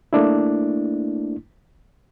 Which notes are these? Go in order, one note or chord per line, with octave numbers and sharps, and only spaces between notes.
A3 A#3 D4 E4